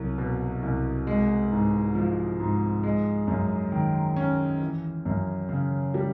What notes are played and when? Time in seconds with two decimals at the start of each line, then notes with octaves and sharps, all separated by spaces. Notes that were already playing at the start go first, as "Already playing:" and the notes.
Already playing: C2 F#3
0.18 B2
0.62 C2
1.07 G#3
1.52 G#2
1.95 F3
2.40 G#2
2.83 G#3
3.27 F#2
3.72 D#3
4.16 C#4
4.61 E3
5.05 F#2
5.49 C#3
5.94 G3